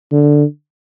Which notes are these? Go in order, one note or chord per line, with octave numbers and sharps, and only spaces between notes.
D3